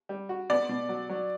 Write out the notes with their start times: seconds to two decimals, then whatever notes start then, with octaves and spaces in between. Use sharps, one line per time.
0.09 G3
0.29 F#4
0.50 B3 D5
0.69 B2
0.89 F#3
1.09 F#3